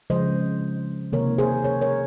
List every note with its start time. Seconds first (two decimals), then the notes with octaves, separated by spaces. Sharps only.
0.10 C#3 F3 G#3 C5 D#5
1.13 C3 D#3 A#3 A#4 C#5
1.38 G#4 C5
1.64 A#4 C#5
1.81 A#4 C#5